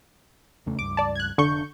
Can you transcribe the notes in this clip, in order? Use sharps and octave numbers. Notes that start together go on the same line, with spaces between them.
E2 C#3 A3
C#2 G2 D6
D5 A5
F#6 G#6
F1 D3 D4 C#6 G6